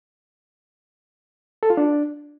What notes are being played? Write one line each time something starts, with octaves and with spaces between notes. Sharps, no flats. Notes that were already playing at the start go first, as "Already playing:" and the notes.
A4
F4
D4